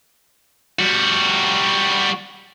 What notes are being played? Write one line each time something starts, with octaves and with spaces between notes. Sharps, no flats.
G3 F#4